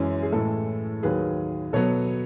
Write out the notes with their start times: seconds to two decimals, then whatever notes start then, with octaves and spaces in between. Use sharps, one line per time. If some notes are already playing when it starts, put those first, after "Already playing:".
Already playing: F#2 E3 G#3 C#4
0.23 G#4
0.32 A2 E3 G#3 A4
1.03 D#2 D#3 F#3 G#4 B4
1.73 B2 F#3 B3 A4 C#5